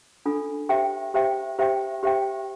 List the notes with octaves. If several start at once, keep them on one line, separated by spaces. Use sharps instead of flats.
D4 F4 A4
G4 C5 E5 G5
G4 C5 E5 G5
G4 C5 E5 G5
G4 C5 E5 G5